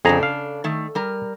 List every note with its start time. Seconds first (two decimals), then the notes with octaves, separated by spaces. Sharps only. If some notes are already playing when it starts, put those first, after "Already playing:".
0.05 F2 C#3 D4 G#4 A4 A#5
0.23 F5
0.64 D#3 A3
0.95 G3 A#4